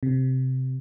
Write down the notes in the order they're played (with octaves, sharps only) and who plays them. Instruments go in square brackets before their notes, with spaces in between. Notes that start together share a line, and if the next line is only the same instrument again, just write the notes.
[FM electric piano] C3